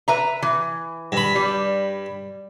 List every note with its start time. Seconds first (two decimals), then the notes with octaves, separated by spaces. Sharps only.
0.08 B4 E5 A#5
0.42 E3
1.12 G2 B5
1.35 G3